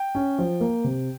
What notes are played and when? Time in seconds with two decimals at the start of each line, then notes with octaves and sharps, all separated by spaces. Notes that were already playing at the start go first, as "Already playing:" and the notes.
Already playing: G5
0.15 C#4
0.39 F3
0.61 A#3
0.84 C3